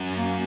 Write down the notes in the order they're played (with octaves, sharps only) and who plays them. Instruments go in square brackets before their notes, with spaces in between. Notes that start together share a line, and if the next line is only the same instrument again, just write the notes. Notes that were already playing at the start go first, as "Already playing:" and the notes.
Already playing: [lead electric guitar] F#2
[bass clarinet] A#3